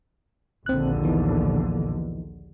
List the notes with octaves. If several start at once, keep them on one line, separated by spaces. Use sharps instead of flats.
A#1 D#2 D3 C4 F#6
E3 B3 D#4